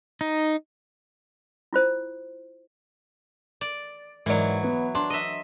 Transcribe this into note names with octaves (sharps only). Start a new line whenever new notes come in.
D#4
E4 F4 C5
D5
G#2 E3 F#3 A#4 D5
B3
D4 C6
D#5 E5